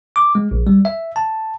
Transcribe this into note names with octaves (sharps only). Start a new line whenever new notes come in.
D6
G#3
A#1
G3
E5
A5